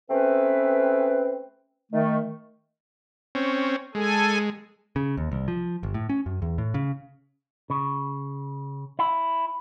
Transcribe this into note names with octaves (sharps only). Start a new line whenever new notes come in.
A3 C4 C#4 B4
D#3 A3
C4 C#4
G#3 A4 G#5
C#3
D#2
C2
F3
G1
A2
C#4
F#2
E2
A2
C#3
C#3
E4